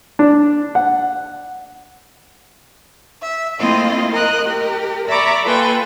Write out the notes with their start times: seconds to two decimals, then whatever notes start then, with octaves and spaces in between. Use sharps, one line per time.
0.19 D4
0.75 F#5
3.21 E5
3.59 A3 A#3 C4 E4 F4 D#5
4.12 A#4 D#5 F#6
4.45 G4 A#4
5.07 D5 E5 A#5 B5 C#6 D6
5.43 A#3 F4 A4 B4 G5 G#5